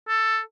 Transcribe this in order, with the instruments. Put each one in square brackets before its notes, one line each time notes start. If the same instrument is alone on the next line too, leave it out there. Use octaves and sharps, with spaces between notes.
[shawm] A4